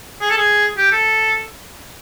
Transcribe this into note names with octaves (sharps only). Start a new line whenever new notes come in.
G#4
A4
G#4
G4
A4